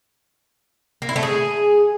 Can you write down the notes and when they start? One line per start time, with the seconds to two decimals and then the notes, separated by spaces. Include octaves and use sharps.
1.02 A#3
1.09 E4
1.16 A3
1.23 G#4